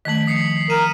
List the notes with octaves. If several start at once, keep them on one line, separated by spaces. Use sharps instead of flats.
D#3 F3 A3 B6 F#7
D#6 C7 C#7
A#4 D#7 E7 F#7